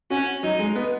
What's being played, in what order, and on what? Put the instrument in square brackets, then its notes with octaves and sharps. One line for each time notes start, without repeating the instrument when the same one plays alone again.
[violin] C#4 [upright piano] F#4
[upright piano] F#3 [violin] D#4
[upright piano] G#3
B3